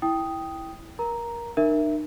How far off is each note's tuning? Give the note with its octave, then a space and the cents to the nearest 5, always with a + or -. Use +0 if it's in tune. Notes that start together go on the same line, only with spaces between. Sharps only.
E4 +0 G5 +0 D#6 +0
A#4 +20 A#5 +0
D#4 -45 A#4 +0 E5 +0